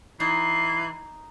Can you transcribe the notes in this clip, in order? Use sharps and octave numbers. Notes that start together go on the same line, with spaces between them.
E3 D#4 C7